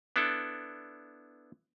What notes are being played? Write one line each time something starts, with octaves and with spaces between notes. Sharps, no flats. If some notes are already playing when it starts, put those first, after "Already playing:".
B3 D4 E4 A4